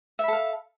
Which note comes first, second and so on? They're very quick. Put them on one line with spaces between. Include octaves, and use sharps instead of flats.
E5 B5 A4 F5